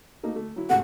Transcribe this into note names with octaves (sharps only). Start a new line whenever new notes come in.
A3 A#3 D#4
A3
F#3 E4
G#2 C3 A3 F#5